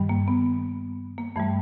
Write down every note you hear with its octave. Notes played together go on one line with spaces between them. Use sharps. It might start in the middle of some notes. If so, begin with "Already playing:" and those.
Already playing: G2 D#3 G3
A#3
B3
A#3
G2 E3 G3 A3